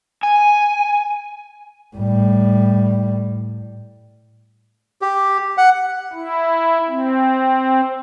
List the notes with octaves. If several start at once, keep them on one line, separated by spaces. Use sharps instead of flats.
G#5
A2 G3
G4
F#5
E4
C4